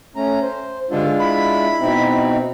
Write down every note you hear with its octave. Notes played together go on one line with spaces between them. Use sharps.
A3 C#4 A#5
C5
C#2 G2 D3 G#3 D4 F4
E4 B5
B2 C4 D#4